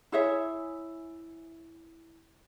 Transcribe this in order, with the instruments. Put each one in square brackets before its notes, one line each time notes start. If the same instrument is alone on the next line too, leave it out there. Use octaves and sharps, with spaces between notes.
[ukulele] E4 G#4 C#5 E5